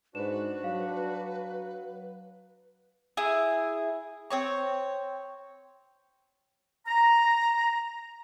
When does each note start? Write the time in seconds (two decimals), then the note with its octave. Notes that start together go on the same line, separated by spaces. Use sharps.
0.15 G#2 D4 F#4 B4 C5 E7
0.64 F#3 F5
3.17 E4 G#4
4.30 C4 C#5 C#6
6.87 A#5